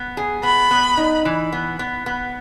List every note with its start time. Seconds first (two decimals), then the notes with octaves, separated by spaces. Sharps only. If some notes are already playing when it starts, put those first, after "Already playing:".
Already playing: B3
0.17 G#4
0.43 B3 B5
0.71 B3
0.97 D#4
1.25 E3
1.52 B3
1.79 B3
2.06 B3